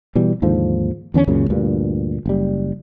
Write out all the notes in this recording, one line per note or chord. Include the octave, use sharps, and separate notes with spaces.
B2 E3 G3
D#2 G#2 D3 F3
E2 D3 C4 C#4
C#2 F#2 A#2 C#3
D2 G2 A#2
F#1 G3